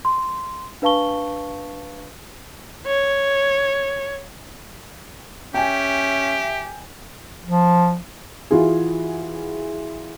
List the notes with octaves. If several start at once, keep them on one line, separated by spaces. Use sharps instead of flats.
C6
D4 B4 F5 A5 C#6 G7
C#5
C#4 G4 E5 G5 G#5
F3
E3 F4 F#4 G#4